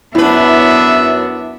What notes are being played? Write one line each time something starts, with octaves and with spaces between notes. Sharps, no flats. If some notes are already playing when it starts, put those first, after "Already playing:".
F#2 B3 D4 E4 B4 E5